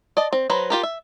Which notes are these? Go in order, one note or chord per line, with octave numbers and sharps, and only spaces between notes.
D5 D#5 A5
C4
F#3 B4 C5 A#5
F4 G4 A#4
E5